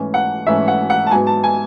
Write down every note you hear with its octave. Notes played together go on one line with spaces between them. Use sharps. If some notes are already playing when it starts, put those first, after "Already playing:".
Already playing: G#2 E3 A3 C#4
F#5
G#2 E3 A3 C#4 E5
F#5
F#5
A5
G#2 F#3 B3 G#5
A5
G#5